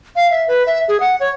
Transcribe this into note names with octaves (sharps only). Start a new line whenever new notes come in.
F5
E5
B4
E5
G#4
F#5
C#5